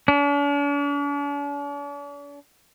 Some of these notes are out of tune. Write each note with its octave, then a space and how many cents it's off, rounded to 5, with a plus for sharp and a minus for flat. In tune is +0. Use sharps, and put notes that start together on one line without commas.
D4 -45